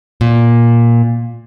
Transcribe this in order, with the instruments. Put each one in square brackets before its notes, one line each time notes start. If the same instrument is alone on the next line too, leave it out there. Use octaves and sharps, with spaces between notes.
[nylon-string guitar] A#2